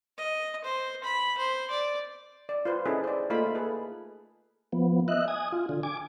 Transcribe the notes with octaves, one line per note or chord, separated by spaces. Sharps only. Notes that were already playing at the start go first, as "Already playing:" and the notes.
D#5
C5
B5
C5
D5
D5
F4 B4 C5
C#4 D#4 E4 G#4 A4 B4
C5 D5
A3 A#3 D#4 F4 B5
G#4 A4 B4
F3 B3
D#5 E5 F#6
G#5 D#6
F4
D3
G#5 D6